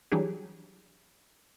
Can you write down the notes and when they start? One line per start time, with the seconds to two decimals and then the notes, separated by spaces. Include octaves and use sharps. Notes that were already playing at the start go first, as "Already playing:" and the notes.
0.12 E3 F#3 G3 D4 G4 G#4